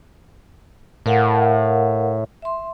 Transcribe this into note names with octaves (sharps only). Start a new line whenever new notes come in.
A2 A#4 F5 F#5
E5 C6